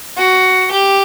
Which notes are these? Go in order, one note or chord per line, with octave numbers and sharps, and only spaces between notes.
F#4
G4